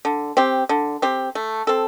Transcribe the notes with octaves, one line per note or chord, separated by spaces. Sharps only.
D3
C4 G4
D3
C4 G4
A3
C4 A4